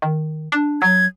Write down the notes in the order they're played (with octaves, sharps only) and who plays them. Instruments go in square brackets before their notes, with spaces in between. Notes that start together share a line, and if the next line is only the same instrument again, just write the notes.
[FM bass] D#3
D4
[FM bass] F#3 [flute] G#6